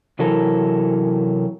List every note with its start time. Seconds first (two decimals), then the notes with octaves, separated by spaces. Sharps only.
0.19 C3 E3 F#3 E4 A4 A#4